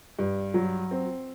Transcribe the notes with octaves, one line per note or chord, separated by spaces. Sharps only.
G2
F#3
C4